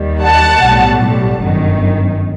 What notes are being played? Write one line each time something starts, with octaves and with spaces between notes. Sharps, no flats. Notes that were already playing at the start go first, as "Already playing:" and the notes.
Already playing: D#2 D#3 G3
F#5 A5
B1 A2 G3
G1 F#2 D#3